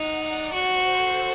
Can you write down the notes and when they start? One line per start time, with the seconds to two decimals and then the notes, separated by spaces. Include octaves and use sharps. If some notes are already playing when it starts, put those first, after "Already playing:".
Already playing: D#4 F#5
0.17 D5
0.53 F#4 C5
0.89 A4